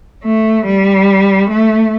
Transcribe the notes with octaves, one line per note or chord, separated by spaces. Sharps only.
A3
G3
A3